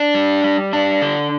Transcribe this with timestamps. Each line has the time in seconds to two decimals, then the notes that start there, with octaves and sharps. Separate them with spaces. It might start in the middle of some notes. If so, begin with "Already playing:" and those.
Already playing: D4
0.15 G3
0.44 G3
0.73 D4
1.02 D3